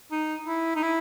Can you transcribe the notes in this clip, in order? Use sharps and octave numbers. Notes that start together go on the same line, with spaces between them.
D#4
E4
D#4
E4